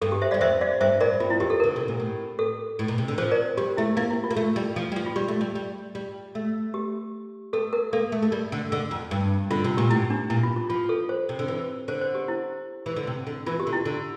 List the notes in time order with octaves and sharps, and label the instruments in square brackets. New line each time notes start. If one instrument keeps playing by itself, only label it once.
[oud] G2 [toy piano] A4
[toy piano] G4
C5 E5
[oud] G2 [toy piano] D5 F5
[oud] F2 [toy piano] C5 E5
[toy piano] D5 F5
[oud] G2 [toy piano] C5 E5
[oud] A2 [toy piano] A#4 D5
[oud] G2 [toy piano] F4
[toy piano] E4
[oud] F2 [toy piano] G4
[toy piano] A4
[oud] D3 [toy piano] A#4
[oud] C3
A#2
A2
[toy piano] A4
[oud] A2
A#2
C3
D3
[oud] F3 [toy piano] C5
[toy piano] A#4 D5
[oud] G3 [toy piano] G4
[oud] A3 [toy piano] E4
[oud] A#3 [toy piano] E4
[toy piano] E4
F4
[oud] A#3
A3
G3
F3
G3
F3
[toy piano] F4
[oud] G3 [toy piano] G4
[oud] A3
G3
G3
G3
A3
[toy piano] G4
[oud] A3 [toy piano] A4
[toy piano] A#4
[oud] A#3 [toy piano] A4
[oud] A3
A3
G3
D3
D3
F2
G2
[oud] D3 [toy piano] F4
[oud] C3
[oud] A#2 [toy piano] G4
[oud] A2 [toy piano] E4
[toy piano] D4
[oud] A#2 [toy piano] E4
[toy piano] F4
F4
[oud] F3 [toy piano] F4
[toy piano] A4
C5
[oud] C3
D3
E3
[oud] D3 [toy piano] C5
[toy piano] C5
G4
E4
[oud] E3
D3
C3
D3
[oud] E3 [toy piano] F4
[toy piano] G4
[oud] D3
[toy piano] E4
[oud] D3